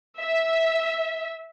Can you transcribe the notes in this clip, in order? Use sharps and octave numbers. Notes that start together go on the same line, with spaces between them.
E5